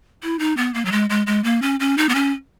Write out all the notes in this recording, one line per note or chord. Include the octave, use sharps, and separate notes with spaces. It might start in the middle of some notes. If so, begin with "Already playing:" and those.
E4
D#4
B3
A#3
F#3
G#3
G#3
G#3
A#3
C#4
C#4
D#4
B3
C#4